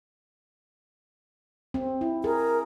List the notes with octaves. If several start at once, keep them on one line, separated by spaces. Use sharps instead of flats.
C4
E4
G#4 A#4